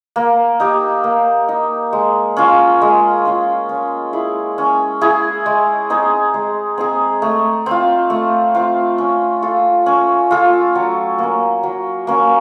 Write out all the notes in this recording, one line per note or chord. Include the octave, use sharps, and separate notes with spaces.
A#3
D#4 G4
A#3
D#4 G4
G#3
C#4 F4
G#3
C#4 F4
C#4
E4 G#4
C#4
E4 G#4
G#3
C4 D#4 G#4
G#3
C4 D#4 G#4
A3
C4 F4
A3
C4 F4
C#4
F4 A4
C#4
F4 A4
F#3
A#3 C#4
F#3
A#3 C#4